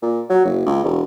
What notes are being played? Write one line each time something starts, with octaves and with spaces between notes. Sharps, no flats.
A#2
F#3
F#1
C#2
E1